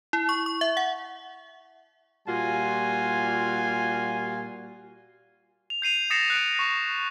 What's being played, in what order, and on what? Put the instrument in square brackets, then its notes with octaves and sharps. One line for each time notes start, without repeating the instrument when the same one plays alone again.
[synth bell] E4
C#6
C#6
E5
F#5
[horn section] A#2 G3 F4 F#4 G#5
[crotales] F7
G6 C7 D#7 F7
D#6 A6 A#6 C7 C#7 E7
F#6 D7
C#6